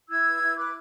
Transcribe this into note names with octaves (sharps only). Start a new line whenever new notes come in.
E4 E6 G#6
B4
E4
B4 D6 F#6